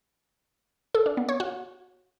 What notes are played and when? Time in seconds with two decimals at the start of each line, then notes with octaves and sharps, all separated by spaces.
0.95 A4
1.06 D4
1.17 B3
1.29 C#5
1.40 F#4